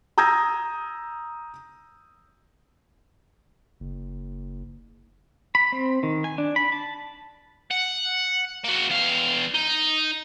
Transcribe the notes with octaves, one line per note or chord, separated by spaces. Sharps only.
A#5 D#6 E6 G6 G#6 A#6
F#1
B5
C4
D#3
G#5
D4
B5
A5
F#5
A#3 F#4
E2 F5
D#4